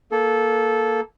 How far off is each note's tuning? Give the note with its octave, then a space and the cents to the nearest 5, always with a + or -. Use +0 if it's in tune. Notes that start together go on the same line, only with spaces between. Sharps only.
A#3 +0 A4 -15